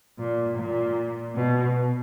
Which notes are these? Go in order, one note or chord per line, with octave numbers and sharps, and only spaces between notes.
A#2
A#2
B2